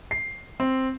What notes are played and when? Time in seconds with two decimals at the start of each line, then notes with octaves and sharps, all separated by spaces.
0.11 C7
0.60 C4